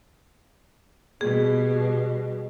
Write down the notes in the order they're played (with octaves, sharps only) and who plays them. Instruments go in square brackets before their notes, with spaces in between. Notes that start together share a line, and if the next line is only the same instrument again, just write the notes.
[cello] B2 G3 [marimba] G#4